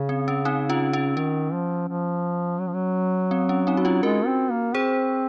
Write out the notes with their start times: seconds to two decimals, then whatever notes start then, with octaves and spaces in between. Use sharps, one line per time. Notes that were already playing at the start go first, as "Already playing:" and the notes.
Already playing: C#3
0.09 C4
0.28 C#4
0.45 C4 D#4
0.69 C#4 F4
0.93 C#4
1.17 D#3 C#4
1.53 F3
1.89 F3
2.60 F#3
2.67 F3
2.74 F#3
3.31 C4
3.49 C#4
3.67 C4 D#4
3.77 F#4
3.85 C#4 F4
4.03 G#3 F#4 A#4
4.26 C4
4.51 A#3
4.74 C4 G#4 C5